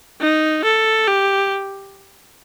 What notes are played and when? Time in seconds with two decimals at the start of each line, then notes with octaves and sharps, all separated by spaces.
0.21 D#4
0.65 A4
1.07 G4